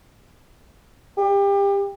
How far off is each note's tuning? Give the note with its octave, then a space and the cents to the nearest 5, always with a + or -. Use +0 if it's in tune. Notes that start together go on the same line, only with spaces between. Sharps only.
G4 +30